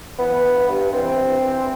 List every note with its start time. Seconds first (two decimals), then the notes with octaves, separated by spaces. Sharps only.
0.19 E3 B3
0.44 G2
0.69 G2
0.93 E3 C4
1.19 G2
1.43 E3